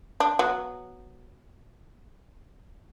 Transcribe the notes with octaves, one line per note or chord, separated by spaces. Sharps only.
D4
F#3 B3 F#4